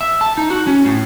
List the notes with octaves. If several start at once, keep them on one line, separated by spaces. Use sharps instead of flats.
E5
A5
D#4
F#4
C#4
A2